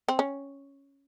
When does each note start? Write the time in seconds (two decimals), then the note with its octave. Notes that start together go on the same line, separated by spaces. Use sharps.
0.08 C4
0.19 C#4